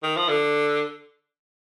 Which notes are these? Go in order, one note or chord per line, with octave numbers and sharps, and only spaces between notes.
D#3
F3
D3